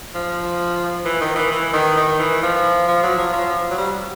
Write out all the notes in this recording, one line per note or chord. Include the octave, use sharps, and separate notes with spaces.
F3
E3
D#3
E3
E3
D#3
D#3
E3
F3
F3
F#3
F3
F3
F#3
G3